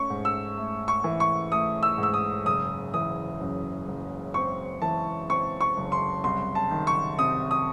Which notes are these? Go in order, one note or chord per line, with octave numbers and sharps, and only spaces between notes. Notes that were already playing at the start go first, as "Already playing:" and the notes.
Already playing: A3 C#4 C#6
G#2
E6
A3
C#6
E3
C#6
A3 D#6
E6
G#2
E6
D#6
F#1 D#6
E3 D#6
F#2
F#1
C4 C#6
E3 A5
C4 C#6
C#6
F#1
C6
C2 C6
A5
D#3
C#6
C3 D#6
D#6